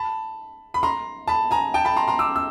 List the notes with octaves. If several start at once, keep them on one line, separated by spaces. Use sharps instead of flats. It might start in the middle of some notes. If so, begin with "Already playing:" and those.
Already playing: A5 B5
B5
A#5 C6
A5 B5
G#5 A#5
G5 A5
A5 B5
A#5 C6
A#5 C6
D6 E6
E6